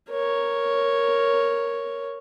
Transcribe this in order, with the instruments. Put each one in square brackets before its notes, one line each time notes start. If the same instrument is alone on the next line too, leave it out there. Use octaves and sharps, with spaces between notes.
[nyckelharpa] A#4 C#5